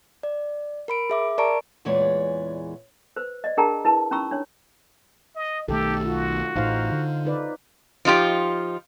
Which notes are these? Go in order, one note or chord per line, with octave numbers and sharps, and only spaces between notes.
D5
A#4 B5 D7
G#4 E5 D6
A#4 D5 A5 A#5 C#6 D7
E2 A#2 E3 G#3 C#5 D5
B4 C5
D5 D#5
D4 G#4 A#4 G5 A5 A#5
E4 B4 A5
C#4 D#4 A#5 B5 C#6 E6
D4 C#5
D#5
B1 D#3 A3 G4 A4
F4 F#4
A1 A2 D#4 C5 F5
D3
D#4 B4 D5
F3 D#4 F4 G4